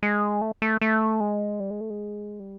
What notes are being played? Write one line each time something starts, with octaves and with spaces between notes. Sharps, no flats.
G#3
A3
A3
A3
G#3
G3
G#3
A3
G#3
G3